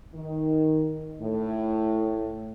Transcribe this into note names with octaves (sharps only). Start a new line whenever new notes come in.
D#3
A2